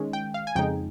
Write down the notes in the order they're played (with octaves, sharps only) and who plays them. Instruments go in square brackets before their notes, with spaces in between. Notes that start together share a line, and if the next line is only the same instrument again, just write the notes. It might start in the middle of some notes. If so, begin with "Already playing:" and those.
Already playing: [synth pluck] D#3 G#3 C#4
G5
F5
G#5
F2 C#3 G#3 D#4 G5